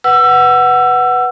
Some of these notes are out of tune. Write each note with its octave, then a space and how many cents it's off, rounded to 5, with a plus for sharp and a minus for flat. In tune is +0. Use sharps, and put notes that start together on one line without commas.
B4 +0 F#5 +5 E6 +25